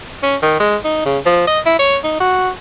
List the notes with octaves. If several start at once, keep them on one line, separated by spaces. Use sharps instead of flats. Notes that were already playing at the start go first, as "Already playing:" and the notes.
C#4
D#3
G#3
D#4
C#3
F3
D#5
E4
C#5
D#4
F#4